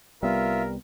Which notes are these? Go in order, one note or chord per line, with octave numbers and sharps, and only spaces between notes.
C2 G3 B3 F4 A#4 E5